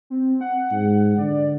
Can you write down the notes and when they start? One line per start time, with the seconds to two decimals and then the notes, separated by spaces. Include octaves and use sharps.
0.10 C4
0.41 F#5
0.72 G#2
1.18 D3 D5